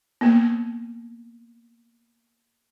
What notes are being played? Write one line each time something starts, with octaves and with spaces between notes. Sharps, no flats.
A#3 B3